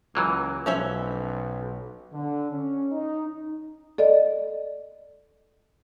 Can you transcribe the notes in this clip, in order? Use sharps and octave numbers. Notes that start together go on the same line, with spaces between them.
C#2 E3 F#3 A#3
B1 F3 C#4 E5
D3
C#4
D#4
A4 D5 D#5